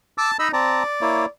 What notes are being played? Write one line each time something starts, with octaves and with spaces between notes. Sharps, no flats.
A5 D6 E6
D#4 D#5 B5 E6
C4 D5 A5 A#5
A#3 E4 C#5